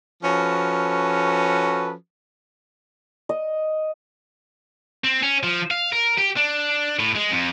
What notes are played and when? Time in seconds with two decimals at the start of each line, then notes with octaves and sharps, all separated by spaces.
0.23 F3 C#4 F#4 A4 B4
3.29 D#5
5.04 C4
5.22 C#4
5.43 F3
5.71 F5
5.93 A#4
6.18 G4
6.37 D4
6.99 A2
7.15 G#3
7.31 F2